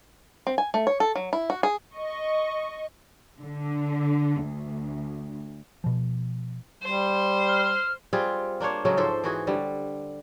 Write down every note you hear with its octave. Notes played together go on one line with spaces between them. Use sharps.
C4
G#5
A3
C#5
A4
F#3
E4
F#4
G#4
D#5 C#6
D3
D2
B2 F3
G3 C5
F6
G3 C4 F4 G#4
A#3 D4 C5 C#5
C#3 F#3 G#3 A3
G#2 F3 A4 C5
E3 F#4 G#4
D3 G3